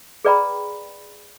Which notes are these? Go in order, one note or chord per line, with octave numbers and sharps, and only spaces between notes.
G#4 B4 D5 G5 A#5 B5